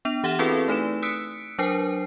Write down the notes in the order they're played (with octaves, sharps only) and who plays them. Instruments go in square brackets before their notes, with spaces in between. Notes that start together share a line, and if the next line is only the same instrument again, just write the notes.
[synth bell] B3 D4 F7
E3 G4 E5 F#5 F6 E7
C4 E4 F#4 G#4 A4 B4
A3 D#4 B4 E7
D#6 E6 F#6 B6 C#7 D7
F#3 D4 A#4 C5 G#5 C7